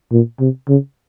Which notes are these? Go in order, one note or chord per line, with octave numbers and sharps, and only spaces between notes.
A#2
C3
C#3